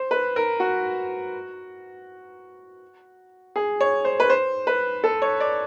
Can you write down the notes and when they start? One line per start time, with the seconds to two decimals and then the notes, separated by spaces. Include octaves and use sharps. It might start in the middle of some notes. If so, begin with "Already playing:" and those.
Already playing: C5
0.11 B4
0.36 A#4
0.60 F#4
3.56 G#4
3.81 C#5
4.05 C5
4.20 B4
4.30 C5
4.67 B4
5.04 A4
5.22 C#5
5.40 D5